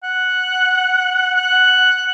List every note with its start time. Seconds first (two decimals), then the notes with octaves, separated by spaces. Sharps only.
0.03 F#5
1.35 F#5